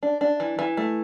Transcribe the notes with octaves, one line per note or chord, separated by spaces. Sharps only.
D4
D4
E3
E3
A3